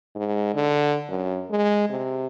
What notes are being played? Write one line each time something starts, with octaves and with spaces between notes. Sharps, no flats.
G#2
D3
F#2
G#3
C3